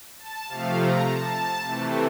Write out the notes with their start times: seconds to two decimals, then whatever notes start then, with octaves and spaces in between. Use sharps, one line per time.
0.19 A5
0.48 C3 F3 A3 F5
0.76 A#5
1.06 A5
1.64 C3 E3 A3